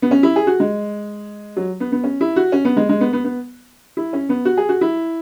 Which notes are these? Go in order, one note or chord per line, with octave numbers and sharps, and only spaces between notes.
B3
C#4
E4
G#4
F#4
G#3
F#3
B3
B3
C#4
E4
F#4
C#4
B3
G#3
G#3
B3
B3
B3
E4
C#4
B3
F#4
G#4
F#4
E4